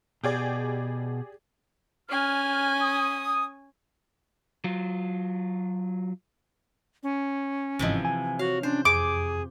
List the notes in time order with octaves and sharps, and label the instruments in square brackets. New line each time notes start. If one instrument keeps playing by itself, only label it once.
[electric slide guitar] B2 [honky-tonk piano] G4 G#4 D5
[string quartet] C#4 G#5 [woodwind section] F6
[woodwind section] D#6
[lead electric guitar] F#3 F4
[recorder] C#4
[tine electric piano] G1 G#2 D#5 [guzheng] C3 E3 F3
[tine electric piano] G#5
[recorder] F#4 [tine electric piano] C#5 [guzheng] F5
[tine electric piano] C#4 [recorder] D4 [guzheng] C5
[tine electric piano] F2 [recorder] G#4 [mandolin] D6